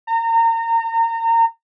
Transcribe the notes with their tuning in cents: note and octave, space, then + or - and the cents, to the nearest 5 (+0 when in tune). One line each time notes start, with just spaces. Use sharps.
A#5 -30